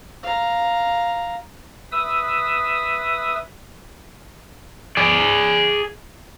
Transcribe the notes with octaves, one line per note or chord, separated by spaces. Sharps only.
F5 A#5
B4 E5 D#6 E6
G#4 D5